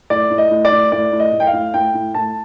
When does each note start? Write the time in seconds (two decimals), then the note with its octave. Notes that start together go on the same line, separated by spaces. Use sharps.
0.10 A2 D5
0.31 A2
0.38 D#5
0.51 A2
0.65 D5
0.72 A2
0.92 A2 D5
1.12 A2
1.20 D#5
1.33 A2
1.40 G5
1.47 F5
1.53 A2
1.74 A2 G5
1.94 A2
2.15 A2 A5